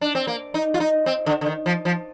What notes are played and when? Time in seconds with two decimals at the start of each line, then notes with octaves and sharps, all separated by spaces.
0.01 D4
0.15 C4
0.27 A#3
0.54 D#4
0.74 F4
0.80 D#4
1.06 C4
1.26 D3
1.41 D3
1.46 D#3
1.66 F3
1.85 F3